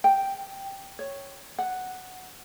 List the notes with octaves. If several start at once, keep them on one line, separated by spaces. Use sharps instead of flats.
G5
C#5
F#5